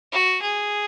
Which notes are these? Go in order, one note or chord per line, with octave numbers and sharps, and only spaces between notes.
F#4
G#4